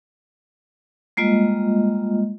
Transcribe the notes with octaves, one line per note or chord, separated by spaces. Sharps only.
G3 G#3 A#3 F4 D#5